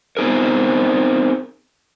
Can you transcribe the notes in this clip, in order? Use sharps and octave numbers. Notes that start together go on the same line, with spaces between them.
B3 C4 D#4 G#4 A#4